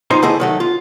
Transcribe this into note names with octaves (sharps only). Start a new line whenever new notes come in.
B1 D#4 F4 C5 G#5 A#5
D3 A3 E4 G#4 D#5
D#3 F#3 A3
F4